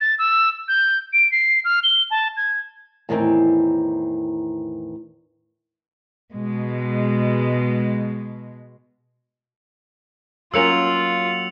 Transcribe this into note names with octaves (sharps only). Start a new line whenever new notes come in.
A6
E6
G6
D7
C7
F6
G7
A5
G#6
E2 A2 D#3 E3 C4
B2 G#3
F#3 A#3 C#4 F4 E6 C#7 F7